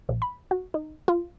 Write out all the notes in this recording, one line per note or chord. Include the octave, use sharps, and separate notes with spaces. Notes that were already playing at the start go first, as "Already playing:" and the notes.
A#1
B5
F#4
D#4
F4